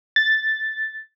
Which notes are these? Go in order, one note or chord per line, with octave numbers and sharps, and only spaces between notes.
A6